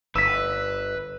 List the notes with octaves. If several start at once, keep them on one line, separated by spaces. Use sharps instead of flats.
G1 B4 E6 B6